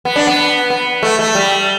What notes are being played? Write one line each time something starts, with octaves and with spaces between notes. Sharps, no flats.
B3
D4
B3
B3
A3
A3
G3